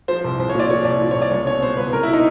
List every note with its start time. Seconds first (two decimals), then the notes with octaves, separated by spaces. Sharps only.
0.08 F3 C5
0.24 C2
0.39 C2 C5
0.49 A#2 C#5
0.59 D5
0.70 F3 C#5
0.85 C2 D5
1.01 A#2
1.11 C#5
1.16 C2
1.22 D5
1.31 C#2 C#5
1.47 B2 C#5
1.62 B2 C5
1.77 C#2 B4
1.93 B2 A#4
2.03 E4
2.13 D#4